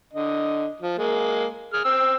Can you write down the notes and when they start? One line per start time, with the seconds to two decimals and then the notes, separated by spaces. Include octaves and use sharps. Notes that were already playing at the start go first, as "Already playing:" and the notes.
0.13 D3 D#5
0.81 F3
0.98 G#3 A#3
1.73 G#4 F6
1.85 C4 E6